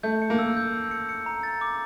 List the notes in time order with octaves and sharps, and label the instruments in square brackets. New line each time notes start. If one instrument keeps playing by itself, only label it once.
[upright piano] A3 [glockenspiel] G6
[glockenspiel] C#7
[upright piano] A#3
[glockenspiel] E6
G6
E6
C#7
C#7
A#5
A6
D6